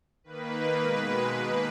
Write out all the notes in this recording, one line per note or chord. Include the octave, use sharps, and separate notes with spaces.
D#3 A#3 B4
B2 G#3
D#3 A#3 B4